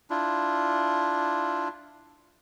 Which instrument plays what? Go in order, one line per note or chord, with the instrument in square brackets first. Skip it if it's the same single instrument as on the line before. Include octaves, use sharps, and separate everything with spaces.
[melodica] D4 E4 F4